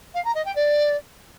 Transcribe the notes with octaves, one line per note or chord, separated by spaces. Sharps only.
F5
A#5
D#5
G5
D5